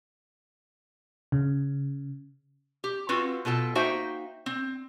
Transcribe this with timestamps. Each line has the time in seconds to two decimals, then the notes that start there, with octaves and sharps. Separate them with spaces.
1.32 C#3
2.84 G4
3.09 C4 F4 F#4 B4
3.45 B2 F4 A4 G5
3.75 A#3 D#4 F#4 C5 E5 G5
4.46 C4